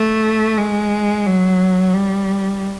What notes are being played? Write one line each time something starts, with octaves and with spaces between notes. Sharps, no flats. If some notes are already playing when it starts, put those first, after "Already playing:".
Already playing: A3
G#3
F#3
G3